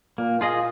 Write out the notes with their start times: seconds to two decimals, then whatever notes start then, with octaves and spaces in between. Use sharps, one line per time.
0.18 A#2 A#3
0.41 F4 G#4 D#5